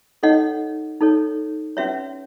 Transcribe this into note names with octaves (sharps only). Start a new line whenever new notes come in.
D#4 A4 C#5 D#5 F#5
D#4 A4 C#5
C#4 F#4 B4 C#5 E5